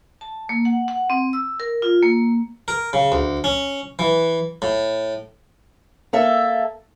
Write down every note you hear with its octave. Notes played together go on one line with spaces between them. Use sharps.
A5
A#3
F#5
F#5
C4
E6
A#4
F4
A#3
A#4
C#3
D2
C#4
E3
A2
A#3 A4 E5